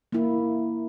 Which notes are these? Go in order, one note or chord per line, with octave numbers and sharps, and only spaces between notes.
A#3 E4